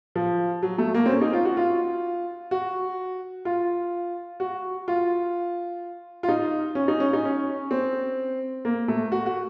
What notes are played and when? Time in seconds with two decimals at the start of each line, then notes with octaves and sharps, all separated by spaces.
0.16 F3
0.63 F#3
0.78 A3
0.94 A#3
1.06 C4
1.09 C#4
1.22 D#4
1.33 F4
1.45 F#4
1.57 F4
2.51 F#4
3.45 F4
4.40 F#4
4.88 F4
6.23 F4
6.29 D#4
6.75 C#4
6.88 D#4
7.00 C#4
7.13 D#4
7.25 C#4
7.71 C4
8.65 A#3
8.88 A3
9.12 F#4
9.26 F#4